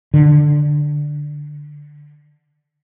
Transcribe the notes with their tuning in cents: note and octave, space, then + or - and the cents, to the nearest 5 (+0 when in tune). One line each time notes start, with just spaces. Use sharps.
D3 +5